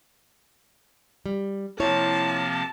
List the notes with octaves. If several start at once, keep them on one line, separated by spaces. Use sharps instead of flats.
G3
C3 F3 A#3 E4 C#5 A5